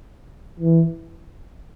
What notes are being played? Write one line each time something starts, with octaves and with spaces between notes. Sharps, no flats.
E3